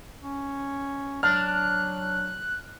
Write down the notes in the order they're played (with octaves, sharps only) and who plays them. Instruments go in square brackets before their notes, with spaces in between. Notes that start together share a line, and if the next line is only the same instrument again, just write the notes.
[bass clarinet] C#4
[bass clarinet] F#3 [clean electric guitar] D4 [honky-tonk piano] F6 [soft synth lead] F#6